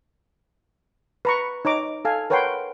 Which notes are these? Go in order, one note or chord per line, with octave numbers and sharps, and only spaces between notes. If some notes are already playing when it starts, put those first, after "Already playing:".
B4 A#5 C#6
D#4 C#5 A#5 D6
A4 F5 G#5
A#4 B4 C#5 F#5 G5 C6